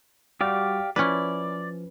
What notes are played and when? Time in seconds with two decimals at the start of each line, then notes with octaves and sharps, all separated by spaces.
0.41 G3 F#4 G4 D5 F5
0.96 F3 C#4 E4 B4 D5